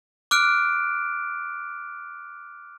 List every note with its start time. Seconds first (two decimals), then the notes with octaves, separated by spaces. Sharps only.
0.31 D6 F6 F#6 D7